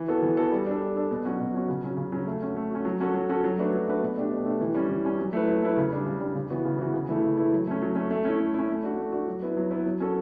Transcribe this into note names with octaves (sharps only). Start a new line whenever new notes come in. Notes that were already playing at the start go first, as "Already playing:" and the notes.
Already playing: E3
B3 F#4 A4
E3
B3 F#4 A4
G3
D4 A4
G3
D4 A4
B2
F#3 C#4 F#4
B2
F#3 C#4 F#4
C#3
F#3 C#4
C#3
F#3 C#4
A3
C#4 F#4
A3
C#4 F#4
F#3
C#4 F#4 A4
F#3
C#4 F#4 A4
F#3
A3 D4 F#4 B4
F#3
A3 D4 F#4 B4
B2
A3 D4 G4
B2
A3 D4 G4
E3
G3 C#4
E3
G3 C#4
F#3
A3 E4 B4
F#3
A3 E4 B4
C#3
G3 D4
C#3
G3 D4
C#3
E3 B3 F#4
C#3
E3 B3 F#4
C#3
E3 A3 E4
C#3
E3 A3 E4
F#3
A3 C#4
F#3
A3 C#4
A3
C#4 E4
A3
C#4 E4
A3
D4 F#4
A3
D4 F#4
F#3
B3 E4 B4
F#3
B3 E4 B4
F#3
C#4 F#4 A4